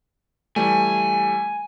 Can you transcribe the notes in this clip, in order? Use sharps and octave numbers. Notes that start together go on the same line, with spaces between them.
E3 G3 A3 G#5